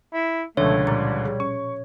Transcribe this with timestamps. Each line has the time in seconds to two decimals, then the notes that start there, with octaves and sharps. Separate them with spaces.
0.13 E4
0.57 C#2 B2 D3 F3 A3 C#5
0.87 A#2 G3 A#5 A6
1.26 G#4
1.40 C#4 C#6